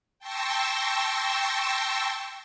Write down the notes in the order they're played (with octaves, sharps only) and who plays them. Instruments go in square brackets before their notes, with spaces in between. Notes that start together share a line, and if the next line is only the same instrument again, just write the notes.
[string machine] G5 A5 C6 C#6 E6 A#6